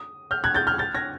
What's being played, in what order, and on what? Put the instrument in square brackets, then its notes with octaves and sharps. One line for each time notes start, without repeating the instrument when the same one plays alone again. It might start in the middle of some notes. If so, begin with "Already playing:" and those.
Already playing: [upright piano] D#6
F6 G6
F#6 G#6
G6 A6
F6 G6
G6 A6
G#6 A#6